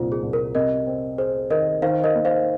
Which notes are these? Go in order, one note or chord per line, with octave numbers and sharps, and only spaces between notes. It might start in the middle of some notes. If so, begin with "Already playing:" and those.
Already playing: C2 A#2 D#4 F4 C5
G#4
C2
A#4
C3 A#4 D#5
C4
G#4 C5
D#3 A#4 D#5
D#3 C5 F5
A#4 D#5
A#3
C5 F5